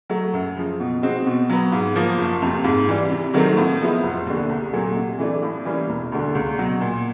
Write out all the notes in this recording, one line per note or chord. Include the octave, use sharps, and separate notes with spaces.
F#3 A3
F#2
C#3 F3
B2
G#3 C4 D#4 F#4
B2
F#3 B3
G#2
F3 A#3
F#1
F2 C3
G#2
E3 G3
C3
D#3 F#3 A3 C4
A2
F3 G#3 B3 E4
F1
D#2 D3
C2
A#2 F#3 A3
C3
E3 A3 D4
A2
E3 G3 A#3 C#4
E1
D2 D3
C#2
B2 F#3
A#2